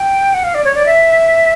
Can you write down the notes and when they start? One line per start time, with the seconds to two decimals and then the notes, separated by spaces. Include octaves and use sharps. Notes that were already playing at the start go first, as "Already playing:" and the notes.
Already playing: G5
0.34 F#5
0.44 F5
0.55 D5
0.65 C#5
0.75 D5
0.86 E5